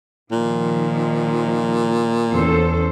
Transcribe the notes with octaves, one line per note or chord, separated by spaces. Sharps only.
A#2 D#3 F3
E2 C#4 A4 C5